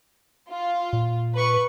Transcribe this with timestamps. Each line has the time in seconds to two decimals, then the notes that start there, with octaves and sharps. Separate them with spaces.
0.50 F4
0.93 A#2
1.34 B4 C#6